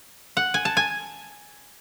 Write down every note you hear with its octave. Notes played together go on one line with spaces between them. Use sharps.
F#5
G#5
A5
G#5